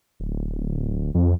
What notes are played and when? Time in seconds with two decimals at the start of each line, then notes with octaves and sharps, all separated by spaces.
0.20 D1
1.14 F2